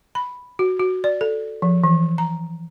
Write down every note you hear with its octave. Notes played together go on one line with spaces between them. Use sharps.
B5
F#4
F#4
D5
A4
F3
E3
A#5